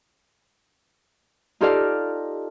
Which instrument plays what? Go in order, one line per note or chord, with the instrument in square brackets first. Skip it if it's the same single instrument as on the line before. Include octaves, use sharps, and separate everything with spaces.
[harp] D#4 F4 G4 A4 D5 F5